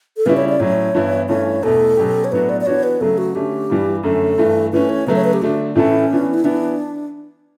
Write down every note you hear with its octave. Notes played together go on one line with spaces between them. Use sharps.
A4
C#3 G3 C#4 E4 B4
C#5
D5
A2 F#3 C#4 C#5
G2 E3 B3 E4
G2 E3 A3 C#4 C#5
E2 B2 A3 A4
B2 F#3 C#4 G4
C#5
A2 F#3 B3 D4 F#4 B4
D5
D5
E3 B3 D4 F#4 C#5
B4
C#3 F#3 A3 A4
F#4
D3 A3 C#4 G4
G2 E3 G3
F#2 D3 A3 C#4 A4
G2 E3 A3
E3 A3 C#4 B4
C#5
C#3 F#3 A3 B4
C#5
B4
G4
D3 A3 D4 F#4
A2 E3 A3 C#4 E4 A4
E3 B3 D4
E4
E3 B3 D4 E4